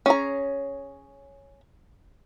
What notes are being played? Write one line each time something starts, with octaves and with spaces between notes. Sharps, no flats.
C#4 G#4 A#5